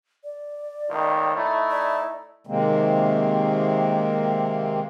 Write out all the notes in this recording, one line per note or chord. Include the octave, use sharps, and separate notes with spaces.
D5
C#2 A2 D#3
A3 D#4 E4
D5
C3 D#3 G#3 A#3 C4